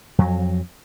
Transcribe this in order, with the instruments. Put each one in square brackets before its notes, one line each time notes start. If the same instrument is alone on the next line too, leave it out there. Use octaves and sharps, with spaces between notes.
[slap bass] F2 F#3